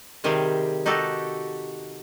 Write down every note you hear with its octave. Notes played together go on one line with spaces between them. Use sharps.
C3 D#3 G3 G4 G#4
D#4 F#4 G4 A4